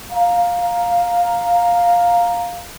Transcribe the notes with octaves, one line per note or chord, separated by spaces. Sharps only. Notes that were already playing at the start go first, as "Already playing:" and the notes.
F5 A#5